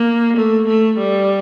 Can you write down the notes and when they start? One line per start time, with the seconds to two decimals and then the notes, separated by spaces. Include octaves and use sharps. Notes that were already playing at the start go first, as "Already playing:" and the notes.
Already playing: A#3
0.37 A3
0.68 A3
0.98 G3